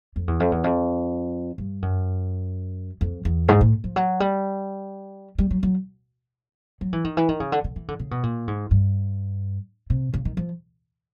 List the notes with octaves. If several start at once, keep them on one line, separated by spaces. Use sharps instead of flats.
F2
E2
F2
E2
F2
G2
F#2
F2
E2
G#2
A2
F3
F#3
G3
G3
F#3
F#3
F#3
E3
D#3
E3
D#3
C#3
D3
D3
E3
D3
C#3
B2
A#2
G#2
G2
C3
C#3
D#3
F3